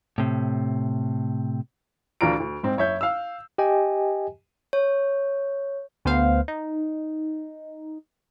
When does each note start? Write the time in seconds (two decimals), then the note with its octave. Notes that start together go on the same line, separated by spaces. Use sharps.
0.18 A2 C3
2.21 D2 E3 D4 F4 A#5 D7
2.40 D2
2.63 G#2 C4
2.77 F#1 C#5 E5 G6
3.01 F5 E6
3.58 G4 D#5 G5 G#5
4.73 C#5
6.05 D2 B3 C5 F5
6.48 D#4